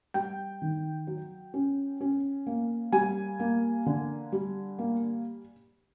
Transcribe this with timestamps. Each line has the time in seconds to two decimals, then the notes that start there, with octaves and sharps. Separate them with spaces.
0.14 G3 G5
0.62 D#3
1.07 F#3
1.54 C#4
2.01 C#4
2.47 A#3
2.92 G3 G#5
3.40 A#3
3.86 D3
4.32 G3
4.79 A#3